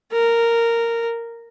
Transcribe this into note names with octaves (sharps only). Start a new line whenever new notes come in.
A#4